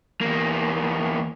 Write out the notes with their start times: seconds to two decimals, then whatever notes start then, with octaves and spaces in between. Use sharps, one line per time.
0.21 E2 A#3